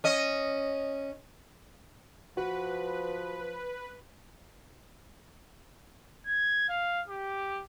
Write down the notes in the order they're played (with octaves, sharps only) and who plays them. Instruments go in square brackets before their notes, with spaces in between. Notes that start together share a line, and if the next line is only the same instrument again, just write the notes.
[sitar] C#4 D#5
[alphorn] F3 [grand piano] F#4 [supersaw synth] B4
[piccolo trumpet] G#6
F5
G4